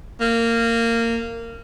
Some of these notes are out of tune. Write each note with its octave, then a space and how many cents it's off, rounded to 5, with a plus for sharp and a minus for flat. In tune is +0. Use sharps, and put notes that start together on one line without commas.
A#3 -20